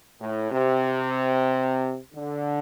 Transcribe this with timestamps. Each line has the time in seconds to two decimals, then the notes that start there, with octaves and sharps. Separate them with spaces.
0.20 A2
0.52 C3
2.14 D3